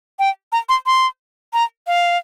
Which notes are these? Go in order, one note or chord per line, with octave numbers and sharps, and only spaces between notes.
G5
A#5
C6
C6
A#5
F5